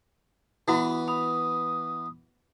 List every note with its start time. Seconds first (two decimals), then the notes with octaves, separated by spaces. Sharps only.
0.68 E3 B3 E4 F#4 D#6
1.08 B5 D#6